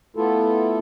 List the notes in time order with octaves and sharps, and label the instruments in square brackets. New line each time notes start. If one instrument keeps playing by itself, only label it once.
[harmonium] A3 B3 E4 F4 A4